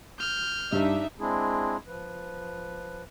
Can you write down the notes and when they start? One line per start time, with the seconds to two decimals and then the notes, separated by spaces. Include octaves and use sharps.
0.19 F6 G6
0.72 G2 D4 D#4 E5
1.20 G#3 C4 D4 E4 G#4
1.88 F3 B4